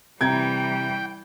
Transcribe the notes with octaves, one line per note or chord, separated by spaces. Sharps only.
C3 E3 G3 G5 A#5 G#6